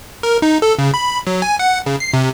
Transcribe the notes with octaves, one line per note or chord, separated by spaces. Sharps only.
A#4
D#4
A4
C#3
B5
F#3
G#5
F#5
C#3
C7
C3